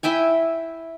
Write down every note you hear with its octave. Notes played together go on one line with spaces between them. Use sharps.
E4 E5 G5 G#5